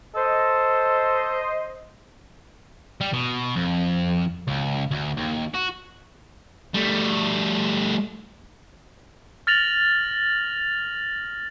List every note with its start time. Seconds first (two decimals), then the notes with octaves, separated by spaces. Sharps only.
0.15 A4 C5 D#5
3.01 G3
3.13 B2
3.56 F2
4.47 C#2
4.91 D2
5.17 D#2
5.54 F#4
6.74 G3 A3
9.47 F6 A6 A#6 F7 F#7